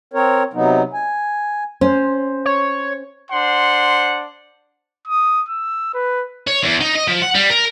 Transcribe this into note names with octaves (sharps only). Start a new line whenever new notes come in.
C4 A#4 C#5
C3 F#3 B3 D#4
G#5
C#4 C5
C#5
D4 C5 F#5 C6
D#6
E6
B4
C#5
E2
D#4
D#5
F3
F#5
G3
A#4